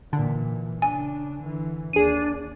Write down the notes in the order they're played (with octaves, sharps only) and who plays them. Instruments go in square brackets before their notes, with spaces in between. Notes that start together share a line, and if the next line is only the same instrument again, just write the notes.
[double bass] A#2 E3 [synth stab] D3
[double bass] C#3 D4 [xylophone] G#5
[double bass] D3 E3
[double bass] D#2 [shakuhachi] D4 [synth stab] G#4 D#7